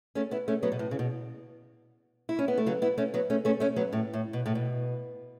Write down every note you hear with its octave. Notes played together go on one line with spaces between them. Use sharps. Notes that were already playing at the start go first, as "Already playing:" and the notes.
A3 C#4
B3 E4
A3 C#4
F#3 B3
B2
A2
C#3
B2
E4
C#4
B3
A3
C#3 F#3
B3 E4
A3 C#4
F#3 B3
A3 C#4
A3 C#4
A3 C#4
F#3 B3
A2
A2
B2
A2
B2